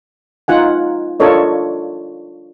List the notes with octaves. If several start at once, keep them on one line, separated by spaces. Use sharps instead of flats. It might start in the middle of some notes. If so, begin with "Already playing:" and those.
D#4 F4 F#5 G#5
D4 F4 A4 A#4 C#5 D#5